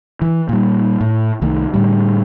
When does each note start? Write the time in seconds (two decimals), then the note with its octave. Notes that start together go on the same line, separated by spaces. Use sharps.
0.22 E3
0.49 A#2 G3
1.01 A2
1.42 C2 D#3 A3
1.74 A2 D3 G3